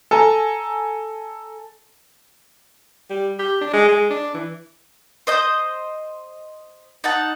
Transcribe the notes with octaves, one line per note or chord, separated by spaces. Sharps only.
A4 G#5 A#5
G3
G4
D4
G#3
G#3
D4
E3
C5 D#5 G6
D#4 F#5 A5